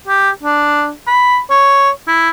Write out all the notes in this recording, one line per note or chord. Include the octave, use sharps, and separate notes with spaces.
G4
D4
B5
C#5
E4